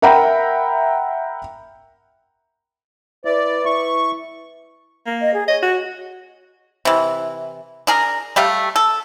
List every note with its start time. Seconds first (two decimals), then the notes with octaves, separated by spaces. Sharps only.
0.02 A#4 E5 F#5 G5 A#5 B5
3.25 E4 B4 D5
3.65 E4 C#6
5.06 A#3
5.21 D#5
5.34 G#4
5.48 C#5 D#5
5.63 F#4
6.85 C3 E3
7.87 D4 G#4 A#4
8.36 G3 A3 G4 F5
8.76 A4